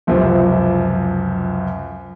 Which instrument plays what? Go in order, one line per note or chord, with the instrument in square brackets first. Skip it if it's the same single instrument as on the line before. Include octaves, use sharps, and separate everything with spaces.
[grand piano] C#2 F#2 C3 F3